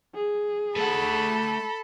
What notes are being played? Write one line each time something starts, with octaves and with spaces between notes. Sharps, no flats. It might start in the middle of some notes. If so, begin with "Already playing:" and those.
G#4
A3 A4 F#5 B5